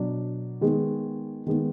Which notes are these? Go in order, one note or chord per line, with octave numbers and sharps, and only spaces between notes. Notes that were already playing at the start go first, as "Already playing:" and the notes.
Already playing: B2 F#3 D4
D#3 G#3 B3
D#3 G#3 B3